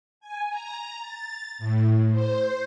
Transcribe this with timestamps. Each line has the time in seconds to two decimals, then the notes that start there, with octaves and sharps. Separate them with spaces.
0.20 G#5
0.50 A#5
1.00 A6
1.59 A2
2.12 C5